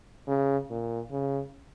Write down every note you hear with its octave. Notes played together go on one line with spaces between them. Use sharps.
C#3
A#2
C#3